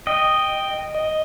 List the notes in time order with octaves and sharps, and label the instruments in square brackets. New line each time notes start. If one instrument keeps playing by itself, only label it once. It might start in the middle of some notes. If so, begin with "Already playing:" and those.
[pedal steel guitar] D#5 [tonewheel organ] G5
[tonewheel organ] D#5